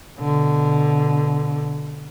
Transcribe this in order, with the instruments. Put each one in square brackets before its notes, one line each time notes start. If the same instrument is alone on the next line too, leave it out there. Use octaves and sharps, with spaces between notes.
[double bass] B2 D3